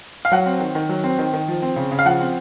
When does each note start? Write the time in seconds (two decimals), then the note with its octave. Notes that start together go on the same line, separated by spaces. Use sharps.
0.25 F5
0.32 F#3 F#5
0.46 C4
0.60 D#3
0.75 D#3
0.89 F#3
1.04 C4
1.19 D#3
1.33 D#3
1.48 F3
1.62 C4
1.76 C#3
1.91 C#3
1.99 F5
2.06 F3 F#5
2.20 C4